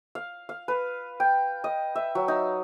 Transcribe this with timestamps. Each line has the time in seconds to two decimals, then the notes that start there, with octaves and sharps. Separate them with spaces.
0.15 F5
0.49 F5
0.68 B4
1.20 G5
1.64 D#5
1.95 E5
2.15 F#3
2.28 D#4